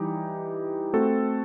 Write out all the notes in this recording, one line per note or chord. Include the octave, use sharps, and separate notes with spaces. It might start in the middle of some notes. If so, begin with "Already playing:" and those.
Already playing: E3 G3 D#4 G4
A3 C4 F#4 A4